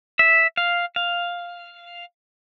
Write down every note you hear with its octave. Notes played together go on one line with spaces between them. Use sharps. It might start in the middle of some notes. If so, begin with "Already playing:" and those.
E5
F5
F5